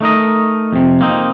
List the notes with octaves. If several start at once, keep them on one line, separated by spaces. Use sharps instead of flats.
A3 D#4 A#4 D#5
F2 C3
A#3 C4 D#4